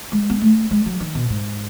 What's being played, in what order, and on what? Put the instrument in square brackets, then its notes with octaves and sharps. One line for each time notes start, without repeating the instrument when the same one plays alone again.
[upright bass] G#3
B3
A3
G#3
F#3
D#3
B2
G#2